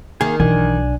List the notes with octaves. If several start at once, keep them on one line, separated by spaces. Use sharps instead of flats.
D#3 A#3 G#4
B1 E3 D4 G#5